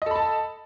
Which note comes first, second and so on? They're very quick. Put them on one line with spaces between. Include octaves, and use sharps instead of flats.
D#5 A4 B5 A5